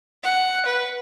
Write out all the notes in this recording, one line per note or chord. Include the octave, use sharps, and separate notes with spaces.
F#5
B4